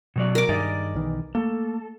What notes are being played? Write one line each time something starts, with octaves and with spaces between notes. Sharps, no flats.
B2 F#3 D5
A#4 D6
G2 D#3 G#4 D5 D#5
B1 D#3 E3
A3 A#3 A4